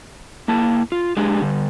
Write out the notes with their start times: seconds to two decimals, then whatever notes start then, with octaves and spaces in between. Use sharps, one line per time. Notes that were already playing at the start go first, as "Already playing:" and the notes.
0.48 A#3 E4 A5
0.92 F4
1.17 G#3 D4 G4 G#4
1.42 D3 G3